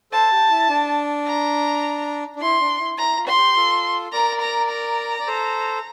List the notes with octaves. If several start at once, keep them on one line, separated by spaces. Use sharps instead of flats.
A4 C5 A5
G4
E4
D4
A#5
D4
E4 C6
D4
E4
E4 A#5
F4
C6
G4
F4 A4
A#4 D5 A#5
A#5
A#5
D5
A4 C5